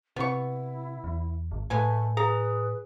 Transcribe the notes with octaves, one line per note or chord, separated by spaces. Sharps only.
C3 B3 E4 C#6
E2
G#1
A2 G#3 A3 B4 G#5
G#4 B4 A#5